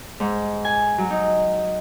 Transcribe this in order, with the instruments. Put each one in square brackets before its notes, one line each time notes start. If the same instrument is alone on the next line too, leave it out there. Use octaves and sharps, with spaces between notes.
[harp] G#2
G#5
F#3
D#4